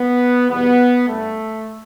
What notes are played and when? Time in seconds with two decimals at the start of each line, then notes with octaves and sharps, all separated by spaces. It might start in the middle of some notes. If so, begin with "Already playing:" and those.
Already playing: B3
0.49 E2 B2 G3 B3
1.08 G2 G3 A3